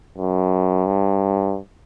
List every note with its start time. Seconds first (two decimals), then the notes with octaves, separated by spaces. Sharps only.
0.18 F#2
0.86 G2